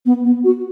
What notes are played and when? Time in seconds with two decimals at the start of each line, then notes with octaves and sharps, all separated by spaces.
0.06 B3
0.24 B3
0.44 F#4